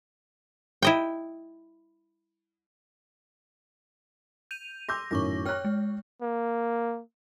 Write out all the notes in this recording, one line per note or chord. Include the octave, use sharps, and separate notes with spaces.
E4 D#5 G5
G6 D#7 F7
C6 D6 E6 G6 A#6
F#2 A2 D#3 C#6 D6 A#6
C#5 G5 F6 F#6
G#3
A#3